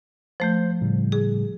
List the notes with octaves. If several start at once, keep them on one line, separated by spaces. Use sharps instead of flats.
F3 A3 C5 G6
A2 C#3 G3
G#4